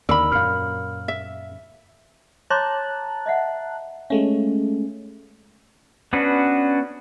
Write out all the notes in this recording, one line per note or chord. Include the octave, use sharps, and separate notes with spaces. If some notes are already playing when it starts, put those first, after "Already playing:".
D#2 D3 A#4 D5 B5 E6
F#2 A#2 F5 F6
E5
C#5 A5 A#5 C6 D6 F#6
D#5 E5 F#5
G#3 A3 C#4 F5
B3 C#4 D4 F#4 B4